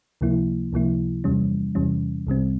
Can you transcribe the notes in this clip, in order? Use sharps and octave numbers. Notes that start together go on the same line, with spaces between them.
C#2 C3 F3 A#3 E4
C#2 C3 F3 A#3 E4
E2 C3 E3 G3 C#4
E2 C3 E3 G3 C#4
C2 C3 G3 C4